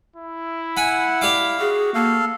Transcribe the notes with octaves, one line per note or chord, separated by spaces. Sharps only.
E4
F#5 G#5 B5
G4 D5 F5 D6
F#4 G#4
A#3 A4 F5